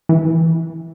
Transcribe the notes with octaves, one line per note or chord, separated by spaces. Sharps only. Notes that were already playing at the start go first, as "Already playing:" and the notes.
E3